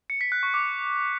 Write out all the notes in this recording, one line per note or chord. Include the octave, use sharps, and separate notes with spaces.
C#7
B6
F#6
C#6
D6